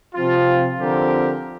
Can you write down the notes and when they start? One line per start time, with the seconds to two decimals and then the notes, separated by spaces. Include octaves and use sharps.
0.15 C3 F3 C4 F4
0.80 D3 F3 C4 G4 A#4